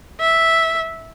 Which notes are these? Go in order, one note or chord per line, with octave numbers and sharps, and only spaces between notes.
E5